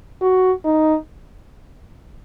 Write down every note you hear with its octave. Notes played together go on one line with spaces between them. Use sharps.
F#4
D#4